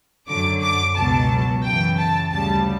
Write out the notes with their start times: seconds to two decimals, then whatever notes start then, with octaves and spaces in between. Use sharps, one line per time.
0.28 F#2 D3 F#3 D6
0.62 D6
0.95 C#2 B2 F#3 A5
1.63 F#2 C#3 E3 G5
1.97 A5
2.31 D2 C#3 G3 A5